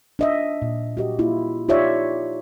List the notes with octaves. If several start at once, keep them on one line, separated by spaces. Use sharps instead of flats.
D4 D#5 E5
A#2
F#4 G4 D#5
A#3 E4 F4
D#4 F4 G4 C#5 D5 E5